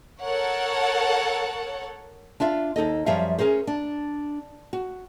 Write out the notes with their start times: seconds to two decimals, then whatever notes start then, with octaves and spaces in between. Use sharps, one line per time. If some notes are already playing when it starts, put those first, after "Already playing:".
0.22 A4 A#4 C#5 F#5
2.40 D4 F4 E5 F5
2.76 D#2 D#4 A4 D#5
3.06 F#2 F3 G3 E5 F5
3.39 C#4 G#4 A#4 C5
3.67 D4
4.73 F#4